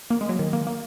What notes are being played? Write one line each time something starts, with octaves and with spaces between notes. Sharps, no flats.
A#3
G#3
F#3
D#3
A#3
A#3